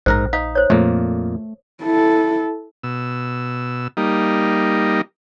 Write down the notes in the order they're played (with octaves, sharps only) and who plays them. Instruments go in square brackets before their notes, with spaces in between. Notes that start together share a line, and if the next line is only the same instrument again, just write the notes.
[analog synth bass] A#1 [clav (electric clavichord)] G#2 A#4 A#5 [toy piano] C5
[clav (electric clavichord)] D#4 [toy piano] F5
[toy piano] C5 C#5
[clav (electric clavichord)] F2 A#2 A#3 [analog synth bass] A3
[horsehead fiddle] E4 A4
[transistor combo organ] B2 E6
G3 A#3 D#4